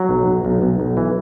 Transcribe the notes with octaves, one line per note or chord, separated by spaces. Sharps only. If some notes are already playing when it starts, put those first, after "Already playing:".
Already playing: F#3
B1
B1
B1
B1
B1
E3